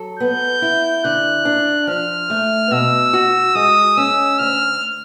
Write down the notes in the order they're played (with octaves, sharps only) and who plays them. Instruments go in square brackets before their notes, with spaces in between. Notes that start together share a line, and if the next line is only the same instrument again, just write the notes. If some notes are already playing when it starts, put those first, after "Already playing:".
Already playing: [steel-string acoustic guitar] F#3 A4
[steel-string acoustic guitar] B3 [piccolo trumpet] G6
[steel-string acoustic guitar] E4
[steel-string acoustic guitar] D3 [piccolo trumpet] F#6
[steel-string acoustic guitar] D4
[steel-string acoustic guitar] F3 [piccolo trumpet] F6
[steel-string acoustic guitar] A3
[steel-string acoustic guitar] B2 [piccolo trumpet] E6
[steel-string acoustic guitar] F#4
[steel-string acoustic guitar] G#3 [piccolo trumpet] D#6
[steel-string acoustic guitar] C#4 [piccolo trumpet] E6
[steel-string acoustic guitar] D2 [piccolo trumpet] F6